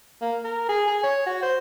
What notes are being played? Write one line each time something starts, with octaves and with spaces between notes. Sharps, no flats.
A#3
A#4
G#4
G#4
C#5
F#4
C5